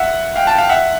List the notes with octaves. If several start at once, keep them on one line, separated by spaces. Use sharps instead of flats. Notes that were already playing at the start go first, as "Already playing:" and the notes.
Already playing: E5 F#5
F5 G5
G5 A5
F5 G5
E5 F#5